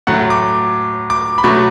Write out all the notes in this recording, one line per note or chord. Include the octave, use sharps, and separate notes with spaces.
A2 F#3 A3 F#5
D6
D6
B5
B2 F#3 A3 C#6